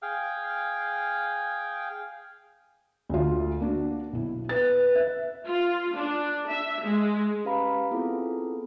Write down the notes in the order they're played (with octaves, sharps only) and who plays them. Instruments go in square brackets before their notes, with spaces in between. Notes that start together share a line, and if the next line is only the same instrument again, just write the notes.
[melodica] G#4 F5 G5
[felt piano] D2 F4
A#3 D4 F#4
B1 E4
[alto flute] B4 [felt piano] A6
[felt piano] E5
[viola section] F4
D4
E5
G#3
[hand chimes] C#4 G4 B4 F5 A#5 B5
B3 C4 E4 F4 G#4 A4